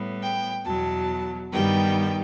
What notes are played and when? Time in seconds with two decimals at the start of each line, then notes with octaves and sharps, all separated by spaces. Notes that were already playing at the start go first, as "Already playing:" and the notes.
Already playing: A2 G3 B3
0.22 G5
0.66 E2 B2 F#3 A5
1.52 G2 D#3 G3 B3 G5